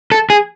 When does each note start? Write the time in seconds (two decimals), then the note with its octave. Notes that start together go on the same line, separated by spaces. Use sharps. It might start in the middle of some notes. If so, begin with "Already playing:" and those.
0.12 A4
0.30 G#4